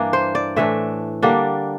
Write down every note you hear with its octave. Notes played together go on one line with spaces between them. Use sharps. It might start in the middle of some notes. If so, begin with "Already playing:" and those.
Already playing: G2 E3 A#3 D4
C5
D5
A2 E3 A3 D4 E5
D3 G3 A#3 D4